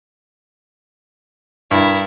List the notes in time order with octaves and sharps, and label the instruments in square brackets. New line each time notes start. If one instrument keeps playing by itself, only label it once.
[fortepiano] G2 [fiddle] E4 A#4